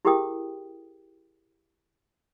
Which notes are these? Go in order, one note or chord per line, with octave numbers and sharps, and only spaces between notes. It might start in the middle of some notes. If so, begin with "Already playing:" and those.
E4 G4 G#4 A#4 G5 D#6